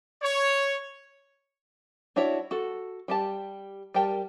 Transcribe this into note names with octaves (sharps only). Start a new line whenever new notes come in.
C#5
D4 E4 F#4 C#5 E5
F#4 A4
G3 G4 A5
G3 G4 A#4 G5 A5